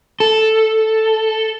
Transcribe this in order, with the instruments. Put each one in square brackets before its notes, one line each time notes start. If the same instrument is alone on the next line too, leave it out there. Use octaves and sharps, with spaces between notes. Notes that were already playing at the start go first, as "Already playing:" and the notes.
[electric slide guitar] A4